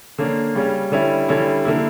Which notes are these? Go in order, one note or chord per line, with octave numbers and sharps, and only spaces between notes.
D3 A#3 C#4
C#3 G3 C#4
D3 G3 C#4 E4
D3 G3 C#4 E4
D3 A#3 E4